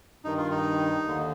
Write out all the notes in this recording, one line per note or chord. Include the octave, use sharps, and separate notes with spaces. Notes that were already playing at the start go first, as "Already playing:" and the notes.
G2 D#3 D#4
F4
D#4
D#2 D3